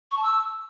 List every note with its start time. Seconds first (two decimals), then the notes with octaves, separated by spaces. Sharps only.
0.11 C#6
0.17 A5
0.23 E6